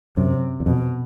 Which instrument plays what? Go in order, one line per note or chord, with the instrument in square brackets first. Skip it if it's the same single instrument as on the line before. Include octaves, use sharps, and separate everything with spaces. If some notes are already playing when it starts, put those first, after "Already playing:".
[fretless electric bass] F#2 [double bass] C3
[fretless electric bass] E2
[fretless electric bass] F2 [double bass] B2